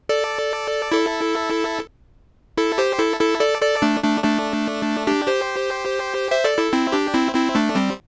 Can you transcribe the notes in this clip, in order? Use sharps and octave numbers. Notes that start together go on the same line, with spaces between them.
A4 D5
E4 A4
E4 A4
G4 C5
E4 A4
E4 A4
A4 D5
A4 D5
A3 D4
A3 D4
A3 D4
D4 G4
G4 C5
C5 E5
A4 D5
E4 A4
C4 E4
D4 G4
C4 E4
C4 E4
A3 D4
G3 C4